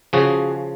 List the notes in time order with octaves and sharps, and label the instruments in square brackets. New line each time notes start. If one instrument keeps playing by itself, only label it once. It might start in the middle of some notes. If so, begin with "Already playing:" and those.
[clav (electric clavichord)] C#3 F3 F#4 G#4